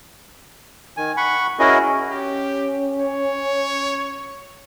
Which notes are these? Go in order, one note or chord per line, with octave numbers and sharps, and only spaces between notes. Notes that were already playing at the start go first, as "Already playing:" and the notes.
D#3 G#5
F#5 B5 C#6
C#4 E4 F#4 G#4 A#4 D#5
C#4 G4
C#5